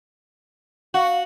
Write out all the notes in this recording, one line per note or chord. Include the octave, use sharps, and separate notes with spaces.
F#4 F5